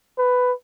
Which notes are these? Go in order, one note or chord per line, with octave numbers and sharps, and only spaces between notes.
B4